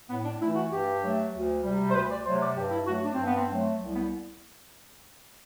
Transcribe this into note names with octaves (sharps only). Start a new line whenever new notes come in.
A2 B3
D4
E3 A3 E4
F#4
G2 G4
F#3 A3
D2
C3 G3
C5
D2 B4
D5
C3 F#3 A3 C5
D5
G2 G4
E4
F#3 A3 F#4
D4
G2 C4
B3
C4
F#3 A3
C2
B3